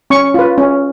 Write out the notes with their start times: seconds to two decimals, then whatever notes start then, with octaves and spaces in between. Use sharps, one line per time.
0.10 C#4 C#6
0.34 F4 B4
0.58 C#4